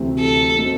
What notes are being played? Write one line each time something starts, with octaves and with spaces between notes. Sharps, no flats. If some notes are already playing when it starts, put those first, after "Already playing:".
Already playing: D2 C3 E3 A3 C4
A4
B2 A3 C4